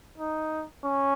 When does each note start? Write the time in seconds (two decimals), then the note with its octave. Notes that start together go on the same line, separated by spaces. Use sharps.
0.18 D#4
0.84 C#4